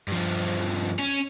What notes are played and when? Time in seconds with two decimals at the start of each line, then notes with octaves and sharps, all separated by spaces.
0.08 G2 F3
0.99 C#4